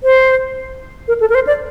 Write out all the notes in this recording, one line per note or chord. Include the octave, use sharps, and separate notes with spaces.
C5
A#4
A4
A#4
C5
D5